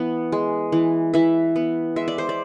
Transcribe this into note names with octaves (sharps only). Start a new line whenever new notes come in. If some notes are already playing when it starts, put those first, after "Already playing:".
Already playing: E3 B3
G#3
E3
E3 E5
B3
G#3 E5
D5
C5
D5